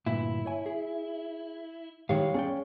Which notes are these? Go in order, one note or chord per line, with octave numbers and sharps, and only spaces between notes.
D2 G2 A#2 E4
C#5 G#5
G#4
G#2 D#3 E3 G3 G4 C#5 F5
C#4 G#4 D5 G5